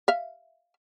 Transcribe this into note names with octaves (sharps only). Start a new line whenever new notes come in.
E5 F5